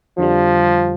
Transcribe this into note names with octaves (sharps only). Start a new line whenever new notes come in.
F2 D3 F3 G3